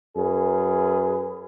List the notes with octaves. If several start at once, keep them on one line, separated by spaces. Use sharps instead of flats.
F#2 G#4 B4